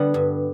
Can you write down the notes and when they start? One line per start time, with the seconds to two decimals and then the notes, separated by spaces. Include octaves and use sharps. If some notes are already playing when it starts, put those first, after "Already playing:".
Already playing: D3 G3 B3
0.14 G2